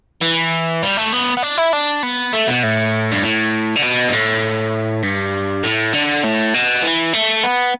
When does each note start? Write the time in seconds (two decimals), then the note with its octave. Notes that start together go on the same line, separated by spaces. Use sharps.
0.22 E3
0.83 G3
0.97 A3
1.13 B3
1.37 B3
1.43 D4
1.58 E4
1.73 D4
2.03 B3
2.33 A3
2.48 B2
2.63 A2
3.12 G2
3.23 A2
3.76 D3
3.83 B2
4.09 G2
4.13 A2
5.03 G2
5.63 A2
5.93 D3
6.23 A2
6.54 B2
6.83 E3
7.13 A3
7.44 B3